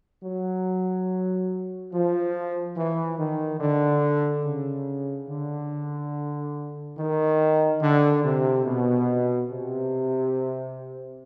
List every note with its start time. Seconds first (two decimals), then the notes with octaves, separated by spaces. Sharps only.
0.23 F#3
1.92 F3
2.76 E3
3.18 D#3
3.60 D3
4.44 C#3
5.29 D3
6.97 D#3
7.81 D3
8.23 C3
8.66 B2
9.50 C3